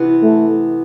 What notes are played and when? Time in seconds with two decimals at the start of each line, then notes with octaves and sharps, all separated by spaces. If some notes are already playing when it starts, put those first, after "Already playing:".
Already playing: C3 E3 B3
0.22 A3